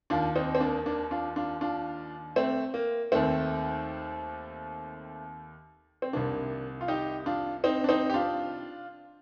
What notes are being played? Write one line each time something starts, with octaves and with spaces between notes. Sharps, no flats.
D#2 D#3 D4 F4
C4 D#4
C4
A#3 D4
A#3 D4
D4 F4
D4 F4
D4 F4
A3 C4
A#3
D#2 D#3 A3 C4
C4
C2 C3 D#3 A#3 D4
F4
D#4 G4
D4 F4
C4 D#4
D4
C4 D#4
G4
D4 F4